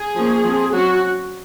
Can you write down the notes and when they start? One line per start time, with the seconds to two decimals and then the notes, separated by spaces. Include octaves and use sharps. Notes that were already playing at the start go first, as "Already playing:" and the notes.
Already playing: G#4
0.16 F3 A#3 C#4
0.44 F3 C4
0.72 F#3 C#4 F#4